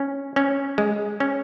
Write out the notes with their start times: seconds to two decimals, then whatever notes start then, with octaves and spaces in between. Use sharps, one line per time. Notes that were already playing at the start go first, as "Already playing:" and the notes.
Already playing: C#4
0.36 C#4
0.78 G#3
1.20 C#4